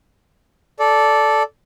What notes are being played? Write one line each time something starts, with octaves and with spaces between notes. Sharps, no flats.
A4 D5